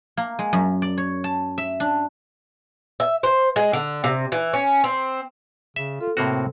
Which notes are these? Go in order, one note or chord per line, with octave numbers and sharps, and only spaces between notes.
A#3
G#3
F#2
D5
C#5
A5
E5
D4
E5
C5
G#3
D3
C3
E3
C#4
C4
C#3 E5
F4 A4
A2 C3 A#3 C4 F#4